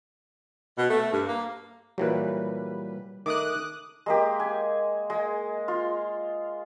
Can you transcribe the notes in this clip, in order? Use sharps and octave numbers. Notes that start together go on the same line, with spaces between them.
B2
A3
G2
A#3
A#2 E3 F#3 G3 B4
D#3 A3 D6 D#6 F#6
G#3 A#3 G4
G#5
G#3
F4